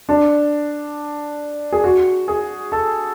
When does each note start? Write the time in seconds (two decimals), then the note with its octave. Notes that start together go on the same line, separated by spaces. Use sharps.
0.09 D4
1.72 G#4
1.84 F#4
2.28 G#4
2.72 A4